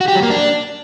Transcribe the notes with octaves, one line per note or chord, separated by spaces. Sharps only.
F#4
G4
F#3
A#3
D4